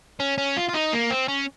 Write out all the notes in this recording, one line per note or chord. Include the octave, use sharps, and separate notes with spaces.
C#4
C#4
F4
F4
D#4
A#3
C4
C#4